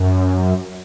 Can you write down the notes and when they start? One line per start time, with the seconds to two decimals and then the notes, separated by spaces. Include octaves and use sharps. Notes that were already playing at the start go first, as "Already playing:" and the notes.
Already playing: F#2